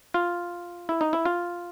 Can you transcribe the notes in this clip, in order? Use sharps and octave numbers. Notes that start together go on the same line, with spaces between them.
F4
E4
D#4
E4
F4